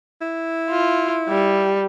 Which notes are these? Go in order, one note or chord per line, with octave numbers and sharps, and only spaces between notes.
E4
F4
G3